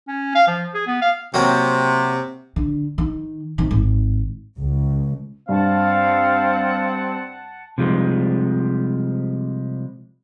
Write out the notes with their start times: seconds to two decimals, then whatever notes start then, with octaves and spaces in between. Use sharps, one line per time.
0.08 C#4
0.35 F5
0.47 F3
0.74 G#4
0.87 B3
1.02 F5
1.34 C3 F#3 A#3 C4
2.56 D3
2.98 D#3
3.58 C3 D#3
3.71 G#1
4.57 C#2
5.49 G2 C4 F5 F#5 A5
7.78 C3 F3 G3 G#3